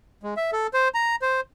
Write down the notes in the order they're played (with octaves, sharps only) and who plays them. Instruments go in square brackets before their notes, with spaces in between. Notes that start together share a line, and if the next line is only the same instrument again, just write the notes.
[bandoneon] G#3
E5
A4
C5
A#5
C5